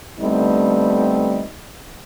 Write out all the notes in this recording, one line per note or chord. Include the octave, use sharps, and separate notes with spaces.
D3 G3 A3 B3 C4 D#4